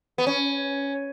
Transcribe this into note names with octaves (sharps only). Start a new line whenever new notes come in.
B3
C#4